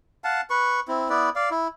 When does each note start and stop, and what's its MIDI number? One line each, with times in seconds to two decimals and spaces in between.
0.24 0.41 77
0.24 0.41 78
0.24 0.41 81
0.50 0.80 71
0.50 0.80 85
0.88 1.09 60
0.88 1.09 64
1.10 1.29 59
1.10 1.29 64
1.10 1.29 71
1.10 1.29 74
1.36 1.49 74
1.36 1.49 77
1.51 1.68 64